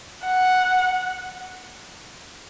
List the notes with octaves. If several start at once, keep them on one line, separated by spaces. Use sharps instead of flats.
F#5